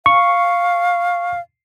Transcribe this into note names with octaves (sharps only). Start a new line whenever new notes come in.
F5 C#6